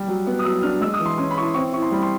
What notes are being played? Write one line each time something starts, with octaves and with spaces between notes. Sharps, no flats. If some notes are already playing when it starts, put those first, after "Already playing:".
Already playing: G3
F#3
B3
D#6
F#3 E6
D4 F6
G#3 E6
D#6
E3
C6
C#4 C6
B5
E4 C#6
C6
C4 C#6
E4 C#6
C6
G3 B5
C6